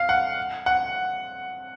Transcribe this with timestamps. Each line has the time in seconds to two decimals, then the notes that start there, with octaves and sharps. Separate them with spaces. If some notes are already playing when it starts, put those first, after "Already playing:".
Already playing: F5
0.09 F#5
0.66 F#5